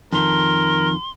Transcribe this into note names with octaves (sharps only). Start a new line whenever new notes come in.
F2 D#3 F3 A#4 C6